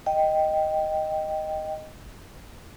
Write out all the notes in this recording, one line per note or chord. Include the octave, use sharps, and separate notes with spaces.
D#5 G5